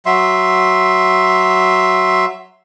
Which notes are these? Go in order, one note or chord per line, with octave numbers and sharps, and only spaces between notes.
F#3 E5 C6